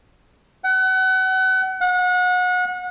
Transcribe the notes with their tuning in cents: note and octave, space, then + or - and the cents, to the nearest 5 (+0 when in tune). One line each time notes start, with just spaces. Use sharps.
F#5 +30
F#5 -30